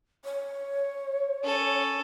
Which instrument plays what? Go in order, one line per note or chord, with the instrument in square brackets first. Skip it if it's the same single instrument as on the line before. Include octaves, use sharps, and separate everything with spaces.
[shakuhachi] C#5
[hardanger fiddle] C#4 A4